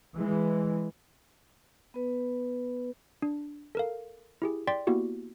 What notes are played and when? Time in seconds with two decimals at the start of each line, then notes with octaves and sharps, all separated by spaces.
0.15 E3 G#3
1.94 B3 B4
3.22 D4
3.75 A4 A#4 F5
4.42 E4 G4 G#4
4.67 D5 G5 C6 A6 B6
4.87 A#3 B3 E4 F#4 G4